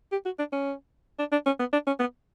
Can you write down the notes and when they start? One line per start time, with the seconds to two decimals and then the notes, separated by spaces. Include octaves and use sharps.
0.12 G4
0.25 F#4
0.39 D4
0.53 C#4
1.19 D4
1.32 D4
1.46 C#4
1.60 B3
1.73 D4
1.87 C#4
2.00 B3